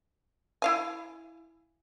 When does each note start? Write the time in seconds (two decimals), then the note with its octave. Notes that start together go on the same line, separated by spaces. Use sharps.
0.62 E4 F5 G#5